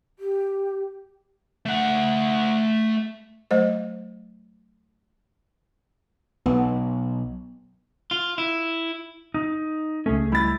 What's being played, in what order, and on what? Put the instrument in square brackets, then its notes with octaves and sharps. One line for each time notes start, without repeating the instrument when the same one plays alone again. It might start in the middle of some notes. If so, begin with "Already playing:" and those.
[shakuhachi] G4
[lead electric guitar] A3 F#5
[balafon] F#3 A3 C5 D#5
[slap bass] B1 [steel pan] B3
[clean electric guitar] F4
E4
[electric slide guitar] D#4
[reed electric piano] C#2 A3 [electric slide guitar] C#4 G#4
[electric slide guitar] G3 E4 [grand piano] B5 A6